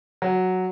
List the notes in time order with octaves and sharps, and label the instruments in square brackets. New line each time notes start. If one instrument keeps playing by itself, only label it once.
[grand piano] F#3